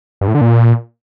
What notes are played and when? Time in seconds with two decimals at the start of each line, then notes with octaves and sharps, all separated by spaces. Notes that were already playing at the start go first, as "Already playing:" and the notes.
0.21 G2
0.28 A2
0.35 D3
0.41 A#2